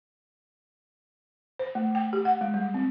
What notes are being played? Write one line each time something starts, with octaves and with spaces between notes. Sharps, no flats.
C5
A3
G5
G4
F#5
G#3
G3
C4